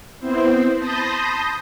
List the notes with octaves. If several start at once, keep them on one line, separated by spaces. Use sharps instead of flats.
B3 C4 E4 C5
A5 B5 C6 D#6 G6 A#6